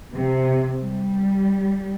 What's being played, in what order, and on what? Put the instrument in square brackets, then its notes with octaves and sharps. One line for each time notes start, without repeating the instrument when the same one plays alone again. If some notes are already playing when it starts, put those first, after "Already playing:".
[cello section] C3
G3